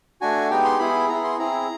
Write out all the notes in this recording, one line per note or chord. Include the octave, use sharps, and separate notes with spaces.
A3 D4 F#4 G#5
G#3 B3 D#4 G4 G5
C6
B3 E4 G#4 B5
B3 E4 G#4 A#5
C6
C4 E4 G#4 A#5